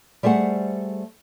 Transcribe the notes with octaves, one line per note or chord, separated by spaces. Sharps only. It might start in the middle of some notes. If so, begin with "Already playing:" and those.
G3 A3 G#4 C5 F#5